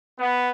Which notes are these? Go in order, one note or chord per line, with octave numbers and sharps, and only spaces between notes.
B3